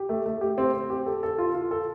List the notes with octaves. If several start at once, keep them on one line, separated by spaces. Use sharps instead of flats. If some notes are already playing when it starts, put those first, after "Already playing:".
Already playing: G4
A3
A3
G4
C4
C4
G4
A4
A4
F4
F4
A4